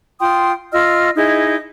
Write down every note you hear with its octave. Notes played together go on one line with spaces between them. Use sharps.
F4 G5 C6 D#6
F4 D#5 E6 F6
D#4 E4 G#4 D#5